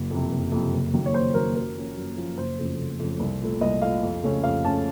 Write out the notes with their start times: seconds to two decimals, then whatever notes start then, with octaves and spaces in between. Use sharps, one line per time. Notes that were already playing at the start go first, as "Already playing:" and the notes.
Already playing: F#1
0.11 F2 C3
0.32 F#1
0.52 F2 C3
0.73 F#1
0.93 F#2 D#3 A#3
1.06 C#5
1.14 F#1 C5
1.34 F#2 D#3 A#3 A#4
1.55 F#2 A#4
1.76 F3 A#3 C#4
1.96 F#2
2.17 F3 A#3 C#4
2.38 F#1 C5
2.58 F2 C#3 A3
2.79 F#1
2.99 F2 C#3 A3
3.20 C2
3.41 A#2 A3
3.61 C2 D#5
3.81 A#2 A3 F5
4.03 F2
4.23 C#3 A3 C#4
4.43 F2 F5
4.64 C#3 A3 C#4 A5